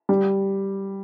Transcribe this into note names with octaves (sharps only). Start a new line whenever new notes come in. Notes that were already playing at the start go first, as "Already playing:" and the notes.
G3